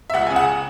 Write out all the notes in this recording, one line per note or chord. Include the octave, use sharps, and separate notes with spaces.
E5
C#2 F#5
C#3 G#5
F#5